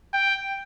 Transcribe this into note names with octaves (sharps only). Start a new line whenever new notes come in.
G5